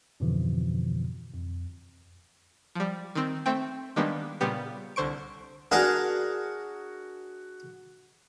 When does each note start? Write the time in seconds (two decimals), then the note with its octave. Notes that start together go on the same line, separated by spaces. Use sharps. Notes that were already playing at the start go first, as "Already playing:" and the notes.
0.20 F2 G#2 B2 D3 E3 F3
1.33 F2
2.75 F3 G3
3.15 D#3 C4
3.46 A3 C4 G5
3.96 D#3 G3 G#3 A#3 B3 D4
4.41 A#2 C#3 G3 B3 G4
4.96 C2 D3 C5 C#6 D7
5.71 D4 F#4 G#4 A#4 F#5